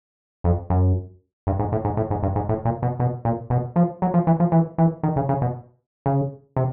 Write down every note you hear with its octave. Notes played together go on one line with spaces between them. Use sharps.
F2
F#2
G2
G#2
A2
G#2
A2
G#2
G2
G#2
A2
A#2
B2
B2
A#2
B2
F3
F#3
F3
E3
F3
E3
E3
D#3
C#3
C#3
B2
C#3
C3